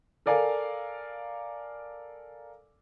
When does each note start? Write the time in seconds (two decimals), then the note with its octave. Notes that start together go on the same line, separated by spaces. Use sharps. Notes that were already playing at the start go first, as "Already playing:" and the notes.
0.26 A4 A#4 D5 F5 G#5